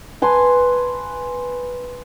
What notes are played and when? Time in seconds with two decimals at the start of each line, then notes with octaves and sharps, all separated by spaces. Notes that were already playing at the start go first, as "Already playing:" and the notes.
0.22 B4 G#5 A5 C6